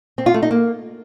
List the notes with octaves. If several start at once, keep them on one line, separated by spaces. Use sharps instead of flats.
C4
F4
A3
D#4
A#3